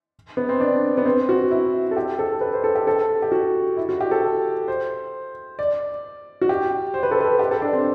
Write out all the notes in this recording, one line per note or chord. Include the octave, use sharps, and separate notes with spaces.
B3
C4
D4
B3
C4
F#4
E4
A4
G4
A4
B4
C5
A4
G4
A4
G4
F#4
E4
F#4
G4
A4
C5
D5
F#4
G4
C5
B4
A4
B4
G4
A4
D4
C4